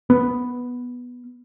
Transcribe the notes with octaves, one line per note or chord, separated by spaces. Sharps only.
B3